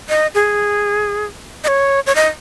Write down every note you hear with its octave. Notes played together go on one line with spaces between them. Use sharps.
D#5
G#4
D#5
C#5
C#5
D#5